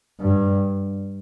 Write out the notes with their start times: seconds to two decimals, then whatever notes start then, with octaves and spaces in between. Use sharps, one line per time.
0.20 G2